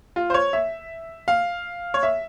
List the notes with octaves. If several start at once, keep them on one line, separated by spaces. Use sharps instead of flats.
F4
C5
C#5
E5
F5
C#5
E5